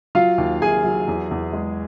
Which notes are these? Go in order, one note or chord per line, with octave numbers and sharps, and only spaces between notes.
F#3 F4 F5
D#2
D#2 G#4 G#5
F#3
E2
E2
G#3